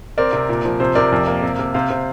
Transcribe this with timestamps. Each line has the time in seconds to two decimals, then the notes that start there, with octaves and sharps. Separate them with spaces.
0.18 C4 A#4 D5
0.33 C3
0.49 A#2
0.65 F3
0.80 C3 C5
0.95 C3 A#4 D5
1.12 F2
1.27 A#3
1.43 C3
1.59 C3
1.74 C3 C5 F5
1.90 C3